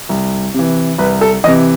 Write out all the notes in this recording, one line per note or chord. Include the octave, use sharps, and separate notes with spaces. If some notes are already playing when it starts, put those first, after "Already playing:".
C2
C3 E3
C2 B4
A4
C3 E3 D#5